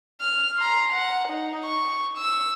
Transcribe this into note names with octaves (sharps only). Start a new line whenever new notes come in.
F6
A#5 C6
F#5
D#4
C#6
E6